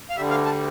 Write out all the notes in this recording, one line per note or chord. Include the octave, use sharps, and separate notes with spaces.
F5
D2 D3 G3 E5
F5
A5